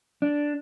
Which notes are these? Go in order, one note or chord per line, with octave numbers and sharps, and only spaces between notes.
D4